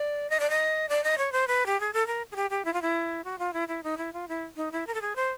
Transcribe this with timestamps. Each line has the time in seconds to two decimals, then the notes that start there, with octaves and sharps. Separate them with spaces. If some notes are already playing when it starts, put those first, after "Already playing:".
Already playing: D5
0.30 D#5
0.40 D5
0.50 D#5
0.89 D5
1.04 D#5
1.18 C#5
1.32 C5
1.48 B4
1.66 G4
1.80 G#4
1.93 A4
2.07 A#4
2.32 G#4
2.36 G4
2.50 G4
2.65 E4
2.73 F4
2.82 E4
3.24 F#4
3.39 F4
3.53 E4
3.68 E4
3.83 D#4
3.97 E4
4.13 F4
4.28 E4
4.56 D#4
4.72 E4
4.87 A#4
4.94 A4
5.01 G#4
5.16 C5